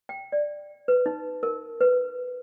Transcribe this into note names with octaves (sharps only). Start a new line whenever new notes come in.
G5
D5
B4
D#4
A#4
B4